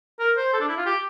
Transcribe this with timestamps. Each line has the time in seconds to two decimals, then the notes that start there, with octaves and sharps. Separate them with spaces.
0.20 A#4
0.37 C5
0.53 A4
0.61 D4
0.69 E4
0.78 F4
0.86 G4